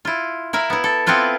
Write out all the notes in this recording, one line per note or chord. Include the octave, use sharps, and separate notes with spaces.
E4 F4
E4 A#4 E5 F5
B3 E4
A4
B3 C4 E4 F4 B4